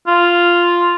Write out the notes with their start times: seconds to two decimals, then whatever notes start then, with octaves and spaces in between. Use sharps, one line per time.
0.07 F4